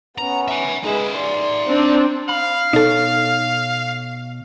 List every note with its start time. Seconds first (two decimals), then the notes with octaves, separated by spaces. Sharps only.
0.18 B3 C#4 A#5
0.48 E5 G#5
0.84 G#3 D#4 B4 E5
1.16 D5 C6
1.68 C4 D4
2.29 F5 B5
2.73 B2 D#4 A4 C#5